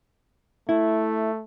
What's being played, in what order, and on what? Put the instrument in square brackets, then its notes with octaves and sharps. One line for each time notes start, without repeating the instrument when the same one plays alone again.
[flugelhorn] A3 [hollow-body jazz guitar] E4